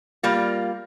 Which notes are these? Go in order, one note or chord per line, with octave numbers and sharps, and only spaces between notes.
G3 A#3 F4